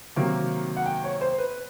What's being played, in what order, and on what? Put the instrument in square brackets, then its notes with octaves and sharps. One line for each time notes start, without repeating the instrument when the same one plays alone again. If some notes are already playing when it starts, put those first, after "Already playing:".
[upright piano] C3 D#3 F#3 A#3
F#5
G5
C#5
C5
B4